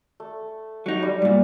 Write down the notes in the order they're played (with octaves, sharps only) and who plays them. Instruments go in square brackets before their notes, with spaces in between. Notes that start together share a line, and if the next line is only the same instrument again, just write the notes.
[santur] A3
[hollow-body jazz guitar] F#3 D#4
[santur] G3
[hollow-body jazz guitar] G2 A#2